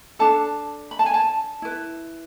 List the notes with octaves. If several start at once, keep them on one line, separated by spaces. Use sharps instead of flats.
D4 A4 A5
B5
A5
G#5
A5
E4 B4